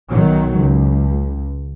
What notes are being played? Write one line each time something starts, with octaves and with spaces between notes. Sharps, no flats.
B1 D#3 F#3
C#2